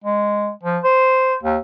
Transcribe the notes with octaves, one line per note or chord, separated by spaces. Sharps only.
G#3
F3
C5
D#2